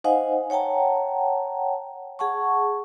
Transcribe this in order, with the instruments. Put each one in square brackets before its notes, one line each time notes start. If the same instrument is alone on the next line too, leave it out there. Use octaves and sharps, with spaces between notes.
[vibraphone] D#4 C5 D#5 F5 F#5 G#5
C#5 F#5 G5 A5 A#5
G#4 F#5 A5 C#6